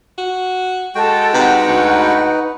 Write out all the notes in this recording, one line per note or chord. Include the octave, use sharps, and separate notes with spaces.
F#4
G#3 F#4 A4 G5
C3 D#4 B4 F#5
D2